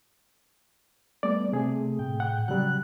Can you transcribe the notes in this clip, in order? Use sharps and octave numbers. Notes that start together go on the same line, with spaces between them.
G3 A3 B3 D5
C3 A3 G#4
A2 G5
F#5
C#3 F#3 G3 F#6